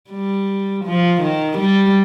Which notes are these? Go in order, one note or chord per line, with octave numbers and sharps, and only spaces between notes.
G3
F3
D#3
G3